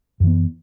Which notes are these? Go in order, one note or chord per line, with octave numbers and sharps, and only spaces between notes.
F#2 E3 B3